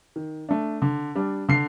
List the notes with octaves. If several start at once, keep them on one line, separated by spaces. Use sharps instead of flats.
D#3
A3 D4
D3
G3 D4
D3 C7